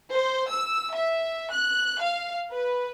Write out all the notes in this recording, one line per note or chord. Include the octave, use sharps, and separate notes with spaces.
C5
E6
E5
F#6
F5
B4